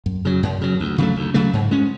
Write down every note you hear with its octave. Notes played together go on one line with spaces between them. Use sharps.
F#2
C#3 F#3
F#2
C#3 F#3
D2
C#3 F#3 A3
D2
C#3 F#3 A3
G#2
G#3 C#4